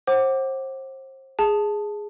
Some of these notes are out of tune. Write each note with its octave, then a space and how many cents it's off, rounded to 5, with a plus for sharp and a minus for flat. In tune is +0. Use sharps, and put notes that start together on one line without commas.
C5 +30 F#5 +15 D6 +0
G#4 +0 A5 +0